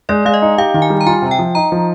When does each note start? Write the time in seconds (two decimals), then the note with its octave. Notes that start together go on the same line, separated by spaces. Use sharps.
0.09 G#3 D5
0.26 G#3 F5
0.34 D#5
0.42 D#4
0.58 G4 F5
0.74 D#3
0.82 G#5
0.90 G3
1.01 A#5
1.06 F4 G#5
1.22 C3
1.31 G5
1.39 F3
1.55 D#4 A#5
1.72 F3